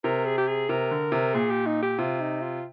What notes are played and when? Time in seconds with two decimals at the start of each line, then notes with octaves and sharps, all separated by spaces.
0.04 C3 A#4
0.25 G#4
0.38 G4
0.48 G#4
0.69 C3 A#4
0.91 D3
1.12 C3
1.34 A#2 G#4
1.50 G4
1.66 D#4
1.82 G4
1.98 C3 F4
2.20 D#4
2.42 F4